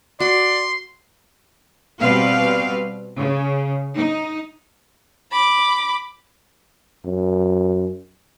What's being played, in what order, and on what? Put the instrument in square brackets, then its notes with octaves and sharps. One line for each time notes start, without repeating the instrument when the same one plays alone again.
[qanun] F#4 [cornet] D5 [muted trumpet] C6
[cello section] B2 G3 B3 C4 B4 F5
C#3
D#4
[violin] B5 D6
[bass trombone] F#2